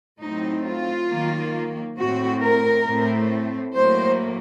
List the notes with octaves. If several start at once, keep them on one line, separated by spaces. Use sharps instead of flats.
A2 F#3 C4 D#4
F4
D#3 F#3 A#3
A2 A3 C4 F#4
A#4
A2 A3 C4
A2 F#3 A#3 C5